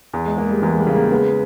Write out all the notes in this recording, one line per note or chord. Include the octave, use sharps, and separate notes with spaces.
E2
G#3
G#3 A#3
G3
E2 E3
G3
C#3
A#3
G#3 B3